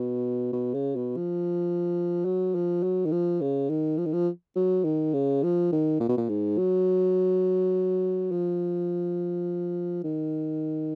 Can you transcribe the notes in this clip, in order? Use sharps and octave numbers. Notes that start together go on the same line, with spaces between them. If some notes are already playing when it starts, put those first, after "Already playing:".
Already playing: B2
B2
C#3
B2
F3
F#3
F3
F#3
D#3
F3
C#3
D#3
F3
D#3
F3
F#3
D#3
C#3
F3
D#3
A#2
B2
A#2
G#2
F#3
F3
D#3